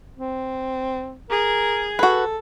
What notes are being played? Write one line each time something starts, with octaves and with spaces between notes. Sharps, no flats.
C4
G#4 A#4
F#4 A4 B4